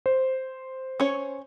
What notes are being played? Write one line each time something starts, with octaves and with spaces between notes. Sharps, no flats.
C5
C#4 C#5